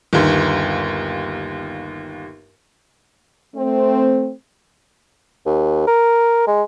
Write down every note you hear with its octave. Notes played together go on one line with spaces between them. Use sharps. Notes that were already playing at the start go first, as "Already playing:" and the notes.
G1 D#2
A3 C4
D#2
A#4
G#3